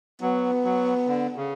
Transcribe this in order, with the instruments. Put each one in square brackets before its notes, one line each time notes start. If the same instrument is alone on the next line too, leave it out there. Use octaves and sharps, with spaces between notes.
[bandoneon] F#3 [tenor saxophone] B3
[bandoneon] F#3
D3
C#3